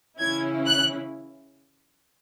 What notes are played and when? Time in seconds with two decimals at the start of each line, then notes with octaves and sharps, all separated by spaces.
0.20 C#3 E3 C#4 E4 G#6
0.67 F#6